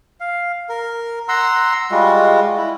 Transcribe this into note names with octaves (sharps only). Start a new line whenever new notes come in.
F5
A#4
F#5 A#5 C6 E6
G3 G#3 F4 F#4
E4